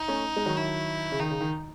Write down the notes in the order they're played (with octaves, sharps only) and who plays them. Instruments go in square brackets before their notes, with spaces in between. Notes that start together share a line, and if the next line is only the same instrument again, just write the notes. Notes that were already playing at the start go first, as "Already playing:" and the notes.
Already playing: [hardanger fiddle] D#4
[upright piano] A3 C#4
G#3
D#3 F#3
[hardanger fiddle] E4
[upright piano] C#3
[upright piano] D#3 [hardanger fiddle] D#4
[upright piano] C#3
D#3